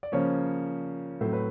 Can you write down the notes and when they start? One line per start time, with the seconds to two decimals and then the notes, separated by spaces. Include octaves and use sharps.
0.03 D5
0.12 C#3 F3 A#3 C#4 C#5
1.21 A2 F#3 A3 C4 C5
1.33 B4